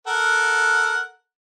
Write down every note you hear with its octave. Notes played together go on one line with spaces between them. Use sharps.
A4 A#4 F#5